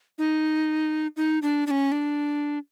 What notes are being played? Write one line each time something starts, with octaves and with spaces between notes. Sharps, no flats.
D#4
D#4
D4
D4
C#4
D4